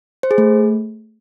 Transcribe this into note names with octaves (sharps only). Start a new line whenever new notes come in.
C5
G#4
A3